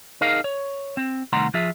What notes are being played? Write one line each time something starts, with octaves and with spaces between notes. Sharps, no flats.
D#4 G#4 A#4 D#5 F5
C#5
C4
C2 D#3 A3 F#5 A#5 C6
F3 F4 G#4 E5